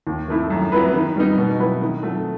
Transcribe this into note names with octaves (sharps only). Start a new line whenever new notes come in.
D#2
D#3 A3 E4
F#2
F#3 B3 E4 B4
D#3
G3 B3 D#4
B2
F#3 B3 E4 B4
D#3
F#3 A3